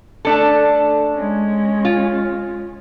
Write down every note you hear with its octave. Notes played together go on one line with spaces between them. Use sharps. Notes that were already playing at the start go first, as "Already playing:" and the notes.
A3 D4 A4
G#3 C#4
F4